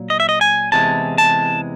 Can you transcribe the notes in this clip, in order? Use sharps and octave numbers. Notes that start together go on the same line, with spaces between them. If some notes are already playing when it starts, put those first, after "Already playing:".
Already playing: A#2 F#3
D#5
E5
D#5
G#5
E2 C3 E3 G#3 A5
A5